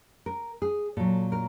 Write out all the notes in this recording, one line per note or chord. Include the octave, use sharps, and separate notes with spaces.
A#4
G#4
A#2 F#3 A4
A#4